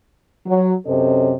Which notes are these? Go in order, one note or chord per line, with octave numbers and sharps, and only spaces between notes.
F#3
F#2 C3 C#4 A4 C5 D#5